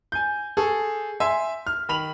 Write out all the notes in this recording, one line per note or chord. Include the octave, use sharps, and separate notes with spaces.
G#5 G6
G#4 A4 C#6
E5 G#5 C6
F6
D#3 B5 F7 F#7